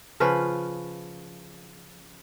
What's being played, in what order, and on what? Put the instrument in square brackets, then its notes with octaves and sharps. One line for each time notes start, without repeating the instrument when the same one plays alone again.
[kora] C#3 F3 C#4 B4